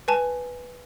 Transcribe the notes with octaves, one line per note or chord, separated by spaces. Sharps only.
B4 G#5 A5